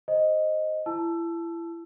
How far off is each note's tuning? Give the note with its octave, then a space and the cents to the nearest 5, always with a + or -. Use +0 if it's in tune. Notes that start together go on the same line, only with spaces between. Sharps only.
C5 +0 D#5 +0
E4 +30 A5 -10 E6 +20